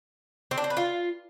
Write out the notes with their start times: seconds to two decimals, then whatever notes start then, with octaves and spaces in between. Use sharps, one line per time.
0.51 C4
0.58 D4
0.64 C4
0.70 B4
0.77 F4